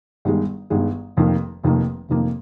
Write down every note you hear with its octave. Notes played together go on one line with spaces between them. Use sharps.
G1 G2 D#3 G#3
G1 G2 D#3 G#3
F1 F2 D#3 A#3
F1 F2 D#3 A#3
F1 F2 D#3 A#3